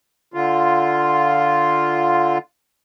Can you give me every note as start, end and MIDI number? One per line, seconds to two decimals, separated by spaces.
0.34 2.38 50
0.34 2.38 65